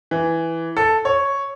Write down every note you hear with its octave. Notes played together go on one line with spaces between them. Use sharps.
E3
A4
C#5